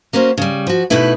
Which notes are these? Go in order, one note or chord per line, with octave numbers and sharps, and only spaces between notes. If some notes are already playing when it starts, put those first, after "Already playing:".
A#3 C#4 F#4 C5
C#3 G3
F3 F#4
B2 A3 D#4 E4 B4